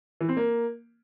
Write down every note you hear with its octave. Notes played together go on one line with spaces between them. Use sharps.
E3
C4
A#3